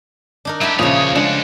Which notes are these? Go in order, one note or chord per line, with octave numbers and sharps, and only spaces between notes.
D4 D#4 A#4
F#3 E4 G4 D5 A5
D#2 A#2 C#3 F3 C#5 D#6 F7
G#3 A3 D4 F#5